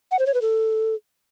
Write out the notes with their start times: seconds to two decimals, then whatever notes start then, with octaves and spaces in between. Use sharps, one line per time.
0.11 F#5
0.19 C5
0.27 C#5
0.34 B4
0.42 A4